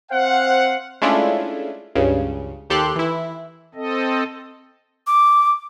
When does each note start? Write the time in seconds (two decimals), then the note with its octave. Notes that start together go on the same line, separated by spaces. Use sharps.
0.12 C4 C5 F5 F#5
1.02 G#3 A3 C#4 D4 E4 F4
1.95 C#2 G2 C#3
2.70 D#2 G4 A4 C6 F#6
2.96 E3 E4
3.75 C4 A4 D#5
5.07 D6